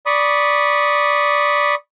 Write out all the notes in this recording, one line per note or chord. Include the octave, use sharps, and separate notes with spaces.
D5 B5 C#6 D#6